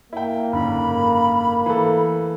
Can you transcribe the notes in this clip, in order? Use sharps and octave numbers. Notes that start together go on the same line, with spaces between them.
A#3 E4 G5
F#1 G#2 D3 B5
E3 A3 A4